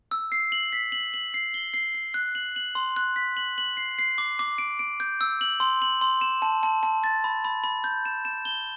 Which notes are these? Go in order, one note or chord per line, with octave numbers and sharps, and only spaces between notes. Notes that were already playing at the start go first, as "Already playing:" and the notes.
E6
C7
F#7
B6
F#7
F#7
C7
G7
C7
C7
F#6
F#7
F#7
C6
F#6
B6
F#7
F#7
C7
C7
D6
D6
D7
D7
G6
E6
F#7
C6
F#7
C6
E7
A5
A5
A5
A6
B5
B5
B5
G6
E7
E7
G7